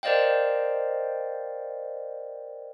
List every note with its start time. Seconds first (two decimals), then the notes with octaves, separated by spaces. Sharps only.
0.03 A#4 C5 D5 D#5 F5 G5